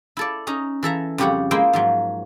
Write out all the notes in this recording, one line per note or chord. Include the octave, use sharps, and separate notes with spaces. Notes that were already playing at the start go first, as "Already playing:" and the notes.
E4 A4 D5
C#4 D#4 A#5
E3 A4 E5 A#5
F2 C#3 G3 G4 C#5 F#5
G#3 A#3 E4 C5 G5
G#2 F3 F#3